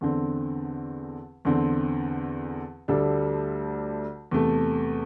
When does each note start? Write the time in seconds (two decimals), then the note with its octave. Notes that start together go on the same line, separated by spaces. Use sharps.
0.01 E2 D3 C4
1.45 E2 D3 C4
2.88 D2 D3 G3 D4 A4
4.31 E2 C3 A3